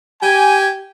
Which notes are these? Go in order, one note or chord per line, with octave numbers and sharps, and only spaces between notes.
G4 G#5